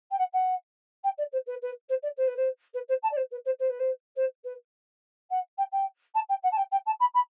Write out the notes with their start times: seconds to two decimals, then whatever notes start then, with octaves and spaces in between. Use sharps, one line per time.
0.11 G5
0.18 F#5
0.33 F#5
1.04 G5
1.18 D5
1.32 C5
1.46 B4
1.61 B4
1.89 C5
2.02 D5
2.17 C5
2.27 B4
2.36 C5
2.73 B4
2.88 C5
3.02 A5
3.11 D5
3.16 C5
3.31 B4
3.45 C5
3.59 C5
3.69 B4
3.79 C5
4.16 C5
4.44 B4
5.30 F#5
5.58 G5
5.72 G5
6.14 A5
6.29 G5
6.43 F#5
6.51 A5
6.57 G5
6.71 G5
6.86 A5
7.00 B5
7.14 B5